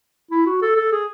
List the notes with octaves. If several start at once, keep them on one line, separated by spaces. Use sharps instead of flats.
E4
F#4
A4
A4
G#4